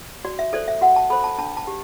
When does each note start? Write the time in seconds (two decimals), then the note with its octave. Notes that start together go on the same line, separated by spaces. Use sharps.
0.25 F#4 D5
0.39 E5
0.53 A4 C5 D5
0.68 E5
0.81 F#4 F#5
0.96 A5
1.10 A4 C5 B5
1.24 A5
1.38 D4 A5
1.57 A5
1.67 G4